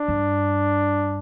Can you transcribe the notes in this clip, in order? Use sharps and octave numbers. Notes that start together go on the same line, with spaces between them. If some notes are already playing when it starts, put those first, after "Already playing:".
Already playing: D4
G2